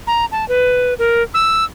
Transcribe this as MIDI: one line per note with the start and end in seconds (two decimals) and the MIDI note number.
0.07 0.25 82
0.32 0.47 81
0.49 0.94 71
0.99 1.23 70
1.34 1.64 88